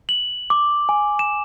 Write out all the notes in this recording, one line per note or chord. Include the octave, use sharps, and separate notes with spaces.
F#7
D6
G#5
E7